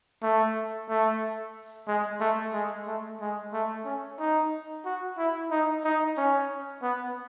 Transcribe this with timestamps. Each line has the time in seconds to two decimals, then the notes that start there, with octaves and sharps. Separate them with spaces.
0.23 A3
0.89 A3
1.87 G#3
2.20 A3
2.53 G#3
2.87 A3
3.20 G#3
3.53 A3
3.85 C#4
4.19 D#4
4.85 F#4
5.17 E4
5.50 D#4
5.84 D#4
6.17 C#4
6.82 B3